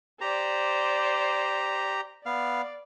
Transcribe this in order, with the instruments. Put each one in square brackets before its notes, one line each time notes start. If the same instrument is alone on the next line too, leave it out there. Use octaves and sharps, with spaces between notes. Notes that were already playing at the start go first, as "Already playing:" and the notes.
[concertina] G4 A#5 [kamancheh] C5 D5
[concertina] B3 F5 [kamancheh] D5